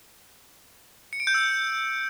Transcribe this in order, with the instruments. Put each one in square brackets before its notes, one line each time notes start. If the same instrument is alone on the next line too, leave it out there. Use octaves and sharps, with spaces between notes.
[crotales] C#7
D7
G6
E6